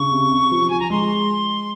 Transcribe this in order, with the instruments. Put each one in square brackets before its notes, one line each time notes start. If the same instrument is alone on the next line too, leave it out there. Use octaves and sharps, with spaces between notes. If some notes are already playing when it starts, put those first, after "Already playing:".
Already playing: [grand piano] C#3 [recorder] C#6
[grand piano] C3
C3
F3
[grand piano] F3 [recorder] G#5
[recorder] A#5
[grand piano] G#3 [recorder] C6